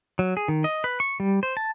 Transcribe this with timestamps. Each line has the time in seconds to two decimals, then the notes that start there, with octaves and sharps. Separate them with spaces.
0.19 F#3
0.37 G#4
0.48 D#3
0.64 D#5
0.84 B4
1.00 C#6
1.20 G3
1.43 C5
1.57 A5